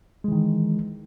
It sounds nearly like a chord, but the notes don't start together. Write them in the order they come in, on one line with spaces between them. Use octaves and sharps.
G#3 E3 D#3